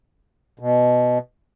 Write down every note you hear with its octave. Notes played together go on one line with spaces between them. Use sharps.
B2